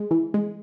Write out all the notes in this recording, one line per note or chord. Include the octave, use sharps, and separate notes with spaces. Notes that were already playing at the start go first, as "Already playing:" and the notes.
Already playing: G#3
E3
G#3